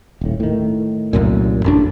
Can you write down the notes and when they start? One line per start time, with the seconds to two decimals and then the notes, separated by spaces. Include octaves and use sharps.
0.21 D#1 A2
0.40 A2 D#3
1.13 C2 F#2 A#2
1.64 A1 F#2 D4